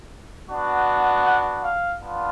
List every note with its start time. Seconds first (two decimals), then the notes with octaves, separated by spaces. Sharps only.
0.49 B3 D4 F#4
1.25 F#5
1.63 F5
2.01 B3 D4 F4